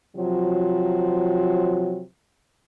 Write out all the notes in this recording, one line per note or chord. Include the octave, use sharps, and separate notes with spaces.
C3 F3 F#3